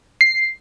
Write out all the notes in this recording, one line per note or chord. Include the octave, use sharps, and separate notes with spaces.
C7